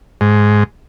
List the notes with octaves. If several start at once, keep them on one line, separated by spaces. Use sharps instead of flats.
G#2